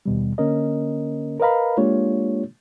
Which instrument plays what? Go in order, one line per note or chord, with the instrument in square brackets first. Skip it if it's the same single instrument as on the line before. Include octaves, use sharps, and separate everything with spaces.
[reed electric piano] D#2 B2 G3
D3 A#3 C#4 A#4 D#5
A#4 B4 D#5 F5 A#5 B5
G#3 A#3 D4 F4 G4 C#5